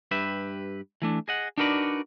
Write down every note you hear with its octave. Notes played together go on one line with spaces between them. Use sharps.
G2 G4 B4 E5
E3 A3 D4
G#4 D#5 F#5
D4 D#4 F#4 A#4 B4 D5